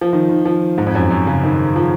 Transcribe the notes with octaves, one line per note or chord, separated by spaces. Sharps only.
F3
D#3
D#3
F3
G#2
F2
F#2
F#2
C#3
D#3
F3